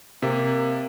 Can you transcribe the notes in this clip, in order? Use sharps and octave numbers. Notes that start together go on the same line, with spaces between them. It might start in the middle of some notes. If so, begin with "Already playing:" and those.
C3 A#3